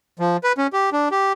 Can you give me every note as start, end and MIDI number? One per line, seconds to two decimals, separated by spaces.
0.19 0.37 53
0.44 0.53 71
0.58 0.67 61
0.73 0.90 67
0.93 1.09 62
1.11 1.33 67